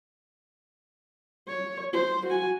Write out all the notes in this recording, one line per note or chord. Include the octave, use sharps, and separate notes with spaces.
C#5
C5
F#4 G#5